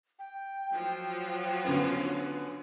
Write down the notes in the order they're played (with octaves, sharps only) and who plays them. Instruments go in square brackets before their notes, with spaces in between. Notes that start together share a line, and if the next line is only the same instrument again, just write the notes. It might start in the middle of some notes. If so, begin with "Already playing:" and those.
[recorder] G5
[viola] F3 F#3
[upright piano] D3 B3 C#4